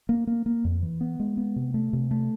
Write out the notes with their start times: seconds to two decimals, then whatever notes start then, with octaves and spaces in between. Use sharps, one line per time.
0.09 A#3
0.27 A#3
0.46 A#3
0.65 F2
0.82 E3
1.01 B3
1.20 G#3
1.37 B3
1.56 C3
1.74 A3
1.93 C3
2.11 A3